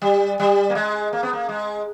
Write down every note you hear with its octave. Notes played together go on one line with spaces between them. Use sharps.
G3
G3
A#3
G#3
A#3
B3
A#3
G#3